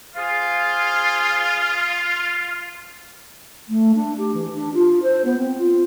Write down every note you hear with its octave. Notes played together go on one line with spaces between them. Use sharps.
F4 G#4 C5 F5
A3
D4
G4
E3
D4
F4
C5
B3
C4
F4